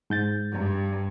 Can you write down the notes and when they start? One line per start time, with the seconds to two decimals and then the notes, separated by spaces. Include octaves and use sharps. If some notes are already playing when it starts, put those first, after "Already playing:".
0.10 G#2 G6 A6
0.52 G2